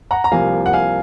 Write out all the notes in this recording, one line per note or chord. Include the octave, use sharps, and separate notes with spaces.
F#5 A#5
A#5
C2 C3 F3 A#3 F5 G#5
F#5
F5 G#5